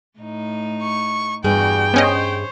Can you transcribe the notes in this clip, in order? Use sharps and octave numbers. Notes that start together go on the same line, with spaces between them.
A2 D#4
C#6
E2 G2 G3 F#4 G#4 G5
B3 C#4 C5 C#5 D#5